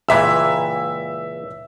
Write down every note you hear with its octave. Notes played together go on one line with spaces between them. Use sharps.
C#2 A#2 E3 E5 E6